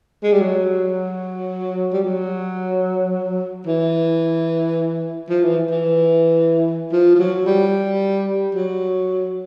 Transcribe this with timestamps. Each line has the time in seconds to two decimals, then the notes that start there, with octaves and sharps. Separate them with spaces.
0.23 G#3
0.32 G3
0.41 F#3
1.93 G3
2.04 F#3
3.67 E3
5.29 F3
5.43 E3
5.71 E3
6.92 F3
7.15 F3
7.19 F#3
7.46 G3
8.55 F#3